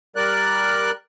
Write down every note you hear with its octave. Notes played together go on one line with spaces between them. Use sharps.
G3 A#4 D5 F#6